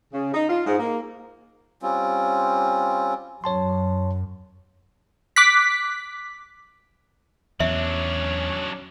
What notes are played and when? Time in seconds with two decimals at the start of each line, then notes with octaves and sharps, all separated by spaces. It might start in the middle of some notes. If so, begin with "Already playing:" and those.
0.13 C#3
0.34 D#4
0.49 F4
0.66 G#2
0.79 A#3
1.82 G3 C4 C#4 F4
3.44 F#2 C#5 A5 C6
5.36 D6 F#6 B6
7.60 E2 F#3 C#4 D4 E5